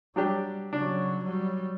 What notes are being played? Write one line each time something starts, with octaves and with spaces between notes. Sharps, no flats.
F#3 G3 D4 G4
C#3 F#3 D4
F#3 G3